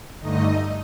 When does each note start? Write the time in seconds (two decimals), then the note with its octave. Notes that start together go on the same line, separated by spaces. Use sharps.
0.20 G2 D3 A3 D#4 D#5